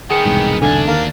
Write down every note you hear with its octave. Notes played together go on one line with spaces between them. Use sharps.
D#3 B3 G#4 G5 C#7
E1 C2 G#2
D2 D3 D4 G#5
D#2 A#4 F5